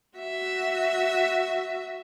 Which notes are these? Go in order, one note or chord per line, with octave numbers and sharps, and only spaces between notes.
F#4 E5